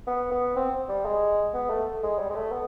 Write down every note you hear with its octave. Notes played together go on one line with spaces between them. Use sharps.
B3
B3
C4
G3
G#3
B3
A3
G#3
G3
G#3
A3
B3